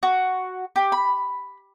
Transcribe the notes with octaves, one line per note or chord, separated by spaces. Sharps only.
F#4
G4
B5